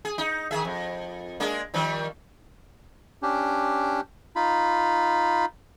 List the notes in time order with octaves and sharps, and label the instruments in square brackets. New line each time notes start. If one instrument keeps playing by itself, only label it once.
[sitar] G#4
D#4
D#3 G#4 E5
F2
G#3 A#3 D4
D#3 F3 G3
[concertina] C#4 D4 G4
D#4 F4 B5